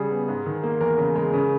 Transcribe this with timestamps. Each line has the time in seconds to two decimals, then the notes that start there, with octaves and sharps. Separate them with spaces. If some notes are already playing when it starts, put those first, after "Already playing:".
Already playing: C#3 G3 G#4
0.11 B3
0.28 G#2
0.46 D#3
0.63 A#3
0.81 E2 A#4
0.98 C#3
1.15 G#3
1.33 C#3